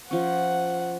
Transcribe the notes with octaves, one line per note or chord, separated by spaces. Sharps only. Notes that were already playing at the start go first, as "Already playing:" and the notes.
F3 C#4 F#5